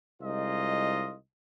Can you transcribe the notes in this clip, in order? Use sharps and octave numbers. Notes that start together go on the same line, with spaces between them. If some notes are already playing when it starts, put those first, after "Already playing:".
C2 G#3 D#4 F4 D#5